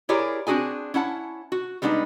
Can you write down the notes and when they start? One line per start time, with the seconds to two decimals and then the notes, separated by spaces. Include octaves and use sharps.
0.09 E4 G4 G#4 A#4 C#5 D5
0.47 C4 D4 F#4 G#4 G#5
0.94 C#4 E4 F#5 A5
1.52 F#4
1.82 G3 G#3 B3 D4 D#4